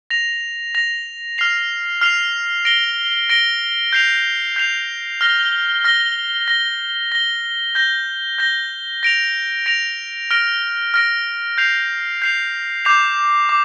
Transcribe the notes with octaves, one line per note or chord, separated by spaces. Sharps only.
A#6 F7
A#6 F7
F6 C7 F7
F6 C7 F7
A#6 D7 G7
A#6 D7 G7
G6 C7 F7
G6 C7 F7
F6 A#6 G7
F6 A#6 G7
A#6 G7
A#6 G7
G6 A#6 G7
G6 A#6 G7
A#6 D7 F7
A#6 D7 F7
F6 A#6 D7
F6 A#6 D7
G6 C7 F7
G6 C7 F7
D6 G6 C7 F7
D6